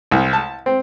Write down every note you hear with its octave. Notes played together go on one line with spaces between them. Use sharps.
C2
A5
C4